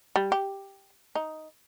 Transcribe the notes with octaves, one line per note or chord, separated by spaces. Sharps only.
G3
G4
D#4